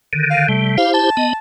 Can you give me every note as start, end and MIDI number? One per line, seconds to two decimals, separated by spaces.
0.13 0.48 50
0.13 0.48 51
0.31 0.48 77
0.49 0.78 48
0.49 0.78 55
0.49 0.76 57
0.78 1.10 64
0.78 1.10 67
0.78 1.10 72
0.78 0.89 77
0.94 1.39 81
1.17 1.33 59
1.17 1.33 75